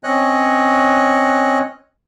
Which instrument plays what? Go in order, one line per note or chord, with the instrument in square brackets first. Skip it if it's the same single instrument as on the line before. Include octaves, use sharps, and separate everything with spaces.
[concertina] C4 C#4 C#5 D#5 F#6